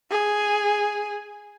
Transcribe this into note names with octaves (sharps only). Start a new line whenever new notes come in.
G#4